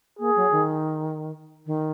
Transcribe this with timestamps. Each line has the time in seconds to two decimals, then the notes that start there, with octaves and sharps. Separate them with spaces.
0.19 A#3 G#4
0.36 F#3
0.51 D#3
1.66 D#3